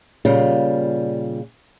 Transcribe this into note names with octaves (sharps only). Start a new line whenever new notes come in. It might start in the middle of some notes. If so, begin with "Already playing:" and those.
A#2 C#3 G3 F4